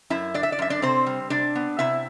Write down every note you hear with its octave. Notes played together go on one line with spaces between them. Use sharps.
F#2 E4 E5
D4 D5
E5
D5
F#2 E5
D4 D5
C3 C4 C5
G3
C3 D4 D5
B3
C3 E4 E5